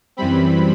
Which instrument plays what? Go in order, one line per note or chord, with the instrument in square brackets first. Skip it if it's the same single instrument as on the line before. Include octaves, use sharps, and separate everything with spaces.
[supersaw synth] F#2 E3 G3 C4 B5